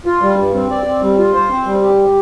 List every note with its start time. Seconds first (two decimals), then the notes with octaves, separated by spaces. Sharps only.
0.06 F4
0.22 G3
0.38 G2
0.54 C4
0.70 D5
0.86 C4
1.02 G3
1.18 F4
1.34 C5
1.50 C4
1.66 G3
1.83 G4